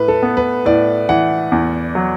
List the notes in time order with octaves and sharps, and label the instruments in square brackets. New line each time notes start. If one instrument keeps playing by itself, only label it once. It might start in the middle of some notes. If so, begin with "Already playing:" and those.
Already playing: [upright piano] A2 [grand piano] B4
[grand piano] A4
[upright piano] B3
[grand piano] B4
[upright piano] A2 [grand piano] D5
[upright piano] E3 [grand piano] F#5
[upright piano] E2
F#3